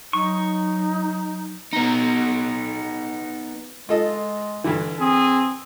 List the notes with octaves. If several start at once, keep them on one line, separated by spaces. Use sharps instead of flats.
F#3 D#4 C#6
B3 D#4
G#3 F4 A4 D#5
G2 D3 E3
C4 G#4